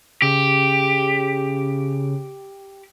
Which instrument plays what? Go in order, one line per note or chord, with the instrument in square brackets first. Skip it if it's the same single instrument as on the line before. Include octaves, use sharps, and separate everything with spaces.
[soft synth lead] C#3 [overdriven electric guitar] G4